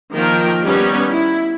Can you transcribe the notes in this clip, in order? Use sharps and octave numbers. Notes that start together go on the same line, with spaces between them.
D#3 F3 A#3 A#4 G5
G3 B3 C#4 D#4
E4